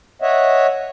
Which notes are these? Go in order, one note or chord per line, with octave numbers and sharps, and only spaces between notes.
C#5 D#5 E5 F#5